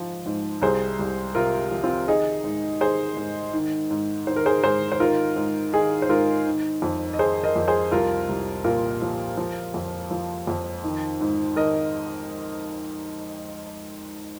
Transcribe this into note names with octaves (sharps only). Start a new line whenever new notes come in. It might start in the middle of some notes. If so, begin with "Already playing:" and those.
Already playing: G#2 F3
G#2
C2 G#4 C5
C2
C3 F4 A#4
F3
C4 F4
D#3 D#4 G#4
G#2
D#3 G#4 C5
G#2
D#3
G#2
D#3 C5
A#4
G#4 C5
G#2 G#4 C5
C5
D#3 F4 A#4
G#2
D#3 D#4 G#4
C5
G#2 F4 A#4
D#3
F2
D#5
D#3 G#4 C5
A#4 D#5
F2
G#4 C5
C2 F4 A#4
C2
A#2 F4 A#4
F3
F3
F2
F3
F2
D#3
G#2
D#3 A#4 D#5